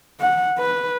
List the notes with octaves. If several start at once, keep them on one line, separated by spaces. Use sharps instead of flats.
F#5
B4